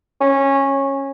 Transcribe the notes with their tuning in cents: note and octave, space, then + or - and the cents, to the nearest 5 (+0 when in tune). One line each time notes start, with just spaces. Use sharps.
C#4 -15